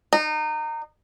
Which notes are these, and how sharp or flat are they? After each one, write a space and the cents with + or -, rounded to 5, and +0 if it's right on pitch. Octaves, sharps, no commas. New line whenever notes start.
D#4 -25